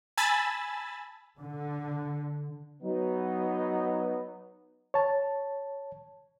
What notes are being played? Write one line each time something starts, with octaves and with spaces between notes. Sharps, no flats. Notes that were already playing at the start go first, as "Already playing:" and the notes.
G#5 A5 B5 E6 A6
D3
F#3 B3 D#4
C#5 A5